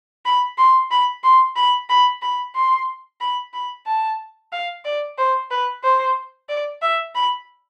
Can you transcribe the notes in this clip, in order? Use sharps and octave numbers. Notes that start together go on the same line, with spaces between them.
B5
C6
B5
C6
B5
B5
B5
C6
B5
B5
A5
F5
D5
C5
B4
C5
D5
E5
B5